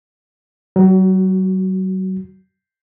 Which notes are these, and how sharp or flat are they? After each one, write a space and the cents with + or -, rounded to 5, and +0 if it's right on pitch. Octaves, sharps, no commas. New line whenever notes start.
F#3 +35 F#4 +0